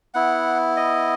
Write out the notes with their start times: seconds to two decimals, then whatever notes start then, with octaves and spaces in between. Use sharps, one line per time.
0.14 B3 E4 F#5
0.77 D#5